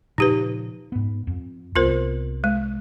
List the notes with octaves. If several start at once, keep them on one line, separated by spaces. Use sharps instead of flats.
A#2 C#3 F3 D#4 G4 B4
G#2 B3
F2
C2 B3 F4 A#4 C5
G#3